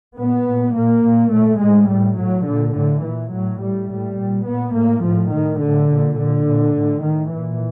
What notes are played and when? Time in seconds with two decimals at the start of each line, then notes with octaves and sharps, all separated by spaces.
0.18 A#2 B3
0.46 A#2
0.75 A#2 A#3
1.04 A#2
1.32 A#2 A3
1.61 A2 G#3
1.89 A2 G3
2.18 A2 F#3
2.46 A#2 D3
2.75 A2 D3
3.03 A#2 E3
3.33 A2 F#3
3.61 A2 G3
3.89 A2 G3
4.18 A#2
4.46 A#2 B3
4.75 A2 A#3
5.04 A2 F3
5.32 A2 D#3
5.61 A2 D3
5.90 A#2
6.18 A#2 D3
6.46 A#2
6.75 A2
7.03 A2 D#3
7.32 A#2 E3